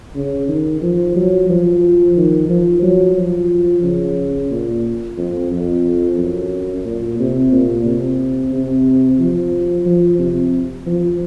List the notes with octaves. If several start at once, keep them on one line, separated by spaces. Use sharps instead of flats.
C#3
D#3
F3
F#3
F3
D#3
F3
F#3
F3
C#3
A#2
F2
F2
F#2
A#2
C3
A#2
C3
C3
F3
F3
C3
F3